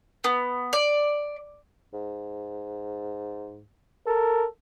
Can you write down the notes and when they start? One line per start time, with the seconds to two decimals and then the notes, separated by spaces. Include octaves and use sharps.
0.24 B3
0.73 D5
1.93 G#2
4.07 A4 A#4